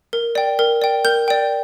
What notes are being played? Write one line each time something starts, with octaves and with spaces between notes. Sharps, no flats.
A#4
D5 G5
A#4
D5 G5
A#4 G6
D5 G5